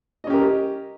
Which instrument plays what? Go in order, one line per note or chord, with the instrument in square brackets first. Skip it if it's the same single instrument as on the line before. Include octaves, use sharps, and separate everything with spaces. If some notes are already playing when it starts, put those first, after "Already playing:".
[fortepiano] D#5
C#4
G4
A#4